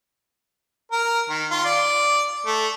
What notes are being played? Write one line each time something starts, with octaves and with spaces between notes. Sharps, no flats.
A#4
D#3
F4
D5
A3